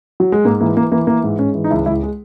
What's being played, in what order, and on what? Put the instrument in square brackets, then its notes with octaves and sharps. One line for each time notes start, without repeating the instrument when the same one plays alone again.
[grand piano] F#3
G#3
G#2 A#3
E3 A#3
E3 A#3
E3 A#3
E3 A#3
G#2
G#2 C#4
E3
D#4
C#2 E4
C#2 E4
G#3